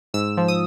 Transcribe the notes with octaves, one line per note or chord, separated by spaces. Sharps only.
G#2 E6
F3
D#6